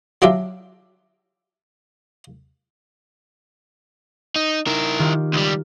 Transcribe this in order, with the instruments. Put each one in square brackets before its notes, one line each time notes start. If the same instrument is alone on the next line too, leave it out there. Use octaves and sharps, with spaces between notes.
[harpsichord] F#3 D4 F4 G4 E5
[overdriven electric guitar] D#4
[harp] D#4 [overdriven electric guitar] E4 A#4
[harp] D#3 F4 G4
[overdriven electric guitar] C#2 G3